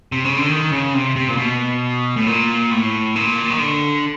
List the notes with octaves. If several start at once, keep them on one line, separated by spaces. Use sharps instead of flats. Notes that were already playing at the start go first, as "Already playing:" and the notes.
C3
C#3
D3
D#3
C#3
C3
C3
A#2
B2
A2
A#2
A2
A#2
D#3
D3